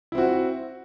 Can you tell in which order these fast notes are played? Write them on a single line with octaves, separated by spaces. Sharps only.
E4 C4 F#4